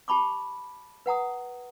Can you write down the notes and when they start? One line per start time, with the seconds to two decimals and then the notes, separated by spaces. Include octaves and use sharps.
0.08 G4 A5 B5 C#6 D6
1.06 B4 F#5 A#5 D#6